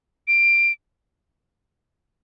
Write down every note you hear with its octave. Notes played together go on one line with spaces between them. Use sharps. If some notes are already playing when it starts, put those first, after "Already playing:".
D7